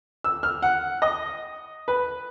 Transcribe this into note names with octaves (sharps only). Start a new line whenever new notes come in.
E6
F6
F#5
D#5
B4